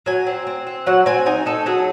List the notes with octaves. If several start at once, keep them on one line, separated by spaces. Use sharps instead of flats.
F#3 G#5
C4
C4
C4
F#3 F#5
C4 G#5
D#4 G#5
D#4 A4
F#3 G#4